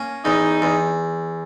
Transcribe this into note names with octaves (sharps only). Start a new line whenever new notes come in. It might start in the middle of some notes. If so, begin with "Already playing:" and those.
Already playing: A#3 C#4
E2 D#4
E2